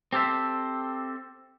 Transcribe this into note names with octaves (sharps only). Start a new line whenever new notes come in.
C4 G4 A4 C5 E5